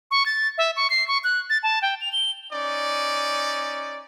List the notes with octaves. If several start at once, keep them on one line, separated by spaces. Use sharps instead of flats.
C#6
A6
E5
C#6
C7
C#6
F#6
A6
A5
G5
F7
G7
C#4 D#4 D5